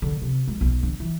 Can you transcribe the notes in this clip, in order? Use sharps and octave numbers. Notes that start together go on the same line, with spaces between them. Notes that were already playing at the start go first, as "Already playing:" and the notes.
D3
C3
G#3
B1
D3
E3